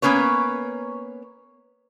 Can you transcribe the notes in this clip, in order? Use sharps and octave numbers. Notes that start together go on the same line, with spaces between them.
A#3 B3 C#4 B4 C#5